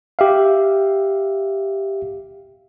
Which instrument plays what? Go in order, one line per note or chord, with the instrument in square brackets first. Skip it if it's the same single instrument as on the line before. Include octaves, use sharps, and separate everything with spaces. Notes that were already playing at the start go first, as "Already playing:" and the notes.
[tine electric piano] G4 E5 F5